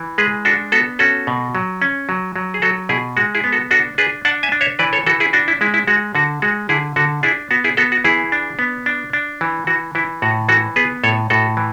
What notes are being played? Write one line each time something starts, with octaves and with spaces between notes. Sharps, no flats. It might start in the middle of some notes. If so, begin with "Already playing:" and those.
Already playing: E3
G#3 G#4 B4
D4 F#4 A4
B3 F#4 A4
C#4 F#4 A4
B2
F#3
C#4
F#3
F#3
G#4
F#3 F#4 A4
B2 E4 G#4
G#3 F#4
E4 G#4
B3
F#4 A4
D4 F#4 A4
D4 G#4 B4
D4 F#5 A5
E5 G#5
D4
C#5 E5
E3 B4 D5
A4 C#5
E3 F#4 A4
E4 G#4
D4 F#4
E4
G#3 E4
E4
G#3 F#4
D3 F#4
G#3 F#4
D3 E4 G#4
D3 F#4 A4
D4 E4 G#4
B3 F#4
E4 G#4
B3 F#4 A4
F#4
E3 E4 G#4
D4
B3
D4
D4
E3
E3 F#4
E3 E4
A2 F#4
E3 F#4 A4
B3 G#4 B4
A2 A4 C#5
A2 F#4 A4
E3